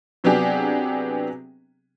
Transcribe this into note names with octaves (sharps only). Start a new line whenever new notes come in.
C3 F#3 B3 D4 G4 G#4